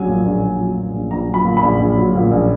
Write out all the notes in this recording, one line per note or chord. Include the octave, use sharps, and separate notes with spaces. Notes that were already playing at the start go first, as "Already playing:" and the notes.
Already playing: A#1 F#3 G#5
A#2
A#1
A#1
F#3
A#2
A#1
A#1 A#5
F#3
B5
A#2
B5
A#1
A#1
F#3
A#2
A#1